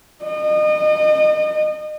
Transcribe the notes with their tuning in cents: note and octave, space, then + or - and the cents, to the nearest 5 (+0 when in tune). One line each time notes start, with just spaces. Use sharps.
D#5 -35